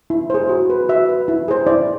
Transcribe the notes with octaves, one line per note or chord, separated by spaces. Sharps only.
E4
G#4 C5
F#4
B4
F#4 E5
B4
E4
G#4 C5
E4 D5